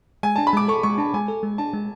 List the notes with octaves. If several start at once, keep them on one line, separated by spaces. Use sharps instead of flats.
G#3 G#5
D4 A5
B5
G#3 D6
A4 C#6
G#3 C#6
D4 A5
G#3 G#5
A4
G#3
D4 A5
G#3